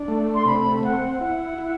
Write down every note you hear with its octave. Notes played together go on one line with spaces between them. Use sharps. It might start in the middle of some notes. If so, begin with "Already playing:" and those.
Already playing: D4
A3
C6
C3 B5
C4 F#5
E4 F#5
E4